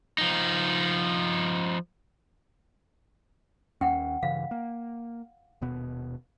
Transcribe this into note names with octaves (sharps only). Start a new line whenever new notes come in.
F3 D#4
D#2 C#4 F#5 G5
G2 C#3 E3 F5
A#3
D#1 B2 B3